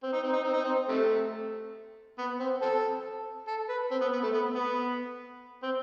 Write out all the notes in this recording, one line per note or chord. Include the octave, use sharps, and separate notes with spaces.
C4
D#4
C4
D#4
C4
D#4
C4
C3 A3
B3
C4
C4 A4
A4
B4
C4
B3
B3
A3
B3
B3
C4